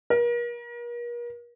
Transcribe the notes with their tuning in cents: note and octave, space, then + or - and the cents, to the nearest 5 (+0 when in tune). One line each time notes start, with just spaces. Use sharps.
A#4 +40